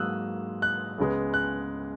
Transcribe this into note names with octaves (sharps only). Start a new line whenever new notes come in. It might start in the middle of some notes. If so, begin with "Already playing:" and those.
Already playing: G#2 F#3 A#3 D#6 E6 F#6
F#6
C#2 C#3 G#3 B3
F#6